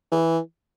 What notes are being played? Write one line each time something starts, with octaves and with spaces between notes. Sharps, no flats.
E3